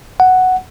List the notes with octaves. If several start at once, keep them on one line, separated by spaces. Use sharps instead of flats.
F#5